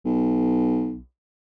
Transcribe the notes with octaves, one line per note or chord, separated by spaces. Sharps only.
B1